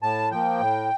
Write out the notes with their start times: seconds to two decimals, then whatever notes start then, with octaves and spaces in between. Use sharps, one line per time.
0.02 A2 A5
0.31 F3 A#3 G5
0.61 A2